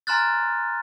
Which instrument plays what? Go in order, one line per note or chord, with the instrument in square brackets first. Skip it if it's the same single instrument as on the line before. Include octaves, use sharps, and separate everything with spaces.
[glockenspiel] G#5 A#5 C6 F6 F#6 A6